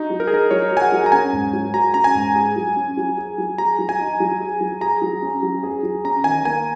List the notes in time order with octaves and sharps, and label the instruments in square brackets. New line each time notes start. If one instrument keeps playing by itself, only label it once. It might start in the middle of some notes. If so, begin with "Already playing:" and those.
Already playing: [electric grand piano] D#4 [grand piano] F#4
[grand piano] F#3
[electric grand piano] A#4
G#4
[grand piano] D#4 [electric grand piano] A#4
[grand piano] F#3 [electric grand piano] C#5
[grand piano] F#4
[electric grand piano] G#5
F#5
[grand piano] F#3
[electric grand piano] A#5
[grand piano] C#4 [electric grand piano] G#5
[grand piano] G#2
F#3
[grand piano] F#4 [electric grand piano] A#5
[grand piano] C#4 [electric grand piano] A#5
[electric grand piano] G#5
[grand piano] G#2
G#4
F#3
C#4
F#3
G#4
F#3
[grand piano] G#4 [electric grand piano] A#5
[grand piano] F#3
[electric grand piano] G#5
[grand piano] D#4
F#3
G#4
F#3
[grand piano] G#4 [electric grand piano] A#5
[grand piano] F#3
C#4
F#3
G#4
F#3
[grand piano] C#4 [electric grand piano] A#5
[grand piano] D#3 [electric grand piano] G#5
[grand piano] A#3 [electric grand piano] G#5